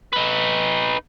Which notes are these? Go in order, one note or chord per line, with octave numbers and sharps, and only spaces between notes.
D#4 B4